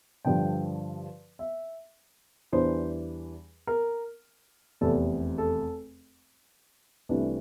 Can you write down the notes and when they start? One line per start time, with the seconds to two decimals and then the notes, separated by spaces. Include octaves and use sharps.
0.25 G2 D3 F3 G5
1.39 E5
2.52 E2 E3 G3 D4 C5
3.67 A#4
4.81 F1 E2 C3 A4
5.38 A4
7.09 C2 C3 E3 A3 D4